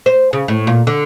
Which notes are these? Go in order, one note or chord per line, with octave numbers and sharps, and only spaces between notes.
C5
C#3
A2
A#2
D3